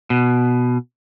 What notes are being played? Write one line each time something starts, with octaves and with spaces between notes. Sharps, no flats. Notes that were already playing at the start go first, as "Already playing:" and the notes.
B2